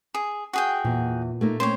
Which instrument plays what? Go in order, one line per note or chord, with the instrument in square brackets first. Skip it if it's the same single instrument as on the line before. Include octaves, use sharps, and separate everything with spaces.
[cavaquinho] G#4
F#4 G#4 G5
[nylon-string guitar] E2 [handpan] A#2
[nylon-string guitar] A3 A#3 D#4
[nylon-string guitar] A#3 C4 C#4 [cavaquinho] C5 C#5